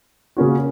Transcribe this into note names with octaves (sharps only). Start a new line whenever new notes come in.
C#3 A#3 C#4 F#4